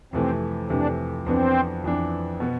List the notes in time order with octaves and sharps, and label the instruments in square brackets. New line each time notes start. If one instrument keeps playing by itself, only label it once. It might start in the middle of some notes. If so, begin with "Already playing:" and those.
[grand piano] F2 C3 E3 A3 [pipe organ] C4
[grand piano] F2 C3 E3 A3 [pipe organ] D4
[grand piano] F2 E3 B3 D4 [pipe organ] C4
[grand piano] F2 E3 B3 D4
B2 B3